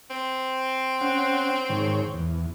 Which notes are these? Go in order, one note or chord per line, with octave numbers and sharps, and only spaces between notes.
C4
C#4 F#5
G#2 D#3 C#5
E2